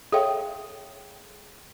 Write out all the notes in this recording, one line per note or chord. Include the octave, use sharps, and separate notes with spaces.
G#4 A4 C#5 E5 F5 G5